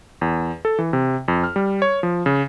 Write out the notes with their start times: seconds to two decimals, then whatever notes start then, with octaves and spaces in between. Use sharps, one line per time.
0.21 E2
0.65 A4
0.79 E3
0.93 C3
1.28 F2
1.44 F6
1.56 G3
1.82 C#5
2.03 F3
2.26 C#3